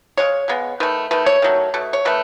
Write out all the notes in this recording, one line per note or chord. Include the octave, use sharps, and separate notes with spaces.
C#3 G#3 C#5
C#3 G#3 B3
D#3 A3 B4
D#3 A3 B4
C#5
D#3 F#3 A3
B2 A3
C#5
D#3 A3 B4